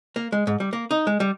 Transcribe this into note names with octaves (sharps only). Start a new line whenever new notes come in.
A#3
G#3
G#2
G3
A#3
D#4
G#3
G3